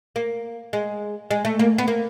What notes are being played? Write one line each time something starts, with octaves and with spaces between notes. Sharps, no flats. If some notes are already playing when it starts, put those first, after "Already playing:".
A#3
G#3
G#3
A3
A#3
B3
A#3